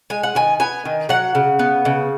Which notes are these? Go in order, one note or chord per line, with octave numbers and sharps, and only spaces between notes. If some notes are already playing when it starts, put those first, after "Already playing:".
G#3 G#5
F#5
D#3 G#5
B3 G#5
D#3
F#3 F#5
C#3
B3
C#3